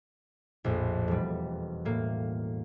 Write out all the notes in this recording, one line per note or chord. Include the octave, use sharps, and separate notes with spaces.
A#1 F2 A2
E1 G3
A2 A#3